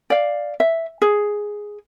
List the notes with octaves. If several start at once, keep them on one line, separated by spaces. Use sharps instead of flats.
D5 F5
E5
G#4